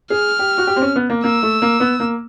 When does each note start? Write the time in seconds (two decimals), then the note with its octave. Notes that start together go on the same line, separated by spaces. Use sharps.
0.10 G#4 F6
0.39 G4
0.58 F#4
0.67 G4
0.76 C4
0.82 C#4
0.96 B3
1.10 A#3
1.24 A#3 E6
1.43 A3
1.62 A#3
1.80 B3
2.00 A#3